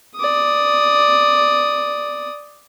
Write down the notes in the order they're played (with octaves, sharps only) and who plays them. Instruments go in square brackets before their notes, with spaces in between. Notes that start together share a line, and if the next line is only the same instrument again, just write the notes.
[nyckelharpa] D5 D#6